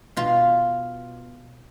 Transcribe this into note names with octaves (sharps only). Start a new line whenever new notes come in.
B2 F4